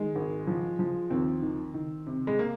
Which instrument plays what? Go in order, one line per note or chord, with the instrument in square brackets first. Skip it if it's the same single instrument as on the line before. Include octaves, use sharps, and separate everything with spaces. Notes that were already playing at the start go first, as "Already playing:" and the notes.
Already playing: [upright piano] D#3 G#3
G#1
F3
F3
D#2 C4
D#3
D#3
C3
G#3
A#3